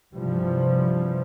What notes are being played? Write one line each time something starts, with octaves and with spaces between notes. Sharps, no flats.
G2 C3 E3 F3 G3